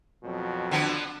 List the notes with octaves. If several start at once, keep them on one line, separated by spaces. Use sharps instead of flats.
F2 B2 F#3
D3 F3 B3